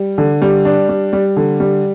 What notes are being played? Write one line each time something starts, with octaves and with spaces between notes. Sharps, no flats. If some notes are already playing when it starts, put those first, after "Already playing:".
Already playing: G3
D3
G3
D4
G3
G3
D3
G3